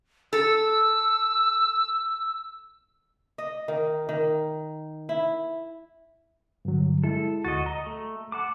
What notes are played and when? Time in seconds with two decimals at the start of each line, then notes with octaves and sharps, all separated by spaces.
0.33 A4 E6
3.38 D#5
3.68 D#3
4.09 D#3
5.09 E4
6.65 G2 D3 F#3
7.04 G#3 E4 A4
7.45 D2 F#4 D#5 A6
7.66 D#5 A#5
7.86 A3
8.32 F#5 A5 D6